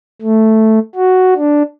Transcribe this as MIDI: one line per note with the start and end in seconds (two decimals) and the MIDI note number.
0.22 0.79 57
0.95 1.34 66
1.36 1.62 62